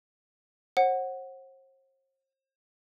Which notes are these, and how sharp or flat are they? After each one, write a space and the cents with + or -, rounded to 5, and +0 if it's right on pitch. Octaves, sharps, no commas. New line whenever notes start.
C5 +40 F#5 +0